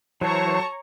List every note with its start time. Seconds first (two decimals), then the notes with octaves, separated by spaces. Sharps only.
0.21 E3 F#3 A4 C5 C#5 A5 A#5 C#6